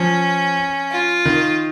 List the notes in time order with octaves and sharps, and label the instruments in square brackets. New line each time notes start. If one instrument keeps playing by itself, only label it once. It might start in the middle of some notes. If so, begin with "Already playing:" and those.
Already playing: [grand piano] F3 [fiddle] C#4
[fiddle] F4
[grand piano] D#3